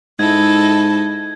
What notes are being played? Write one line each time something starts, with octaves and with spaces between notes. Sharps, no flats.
G#2 E4 A4 D#5 G#6